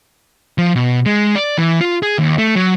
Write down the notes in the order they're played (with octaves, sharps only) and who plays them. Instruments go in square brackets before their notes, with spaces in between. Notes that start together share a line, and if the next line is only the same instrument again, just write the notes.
[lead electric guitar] F3
B2
G#3
D5
E3
F4
G#4
D#2
A3
F#3